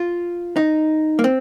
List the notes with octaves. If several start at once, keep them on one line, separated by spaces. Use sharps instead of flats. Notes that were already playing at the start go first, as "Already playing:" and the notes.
Already playing: F4
D#4
A#3
C4